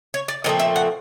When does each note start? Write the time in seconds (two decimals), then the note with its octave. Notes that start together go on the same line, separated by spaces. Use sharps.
0.14 C#5
0.28 D5
0.44 A#2 F3 A3 C4 D#5
0.60 E5
0.76 F#5